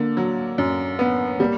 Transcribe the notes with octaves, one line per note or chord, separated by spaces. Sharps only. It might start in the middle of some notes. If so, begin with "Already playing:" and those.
Already playing: D3 A#3
F#3
F#2
B3
G3 A#3